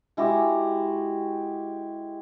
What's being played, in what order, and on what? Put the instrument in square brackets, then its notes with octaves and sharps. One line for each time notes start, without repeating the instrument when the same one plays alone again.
[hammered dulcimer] G#3 E4 F#4 G4